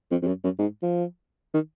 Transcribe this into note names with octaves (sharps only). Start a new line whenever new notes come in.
F2
F2
F#2
F#2
G#2
F3
D#3